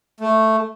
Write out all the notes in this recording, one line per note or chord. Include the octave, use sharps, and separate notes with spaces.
A3